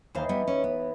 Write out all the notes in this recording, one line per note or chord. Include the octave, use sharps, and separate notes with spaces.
D#2 E3 D#4 C5 F5
G3 B3
C#4
B3